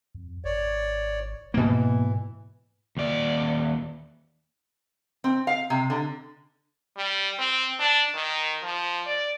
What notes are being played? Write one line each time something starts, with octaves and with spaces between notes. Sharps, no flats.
F2
G#1 C#5 D5
G#2 B2 E3 A#3
D#2 D5
C4
F5
C3
D3
G3
C4
D4
D#3
F3
D5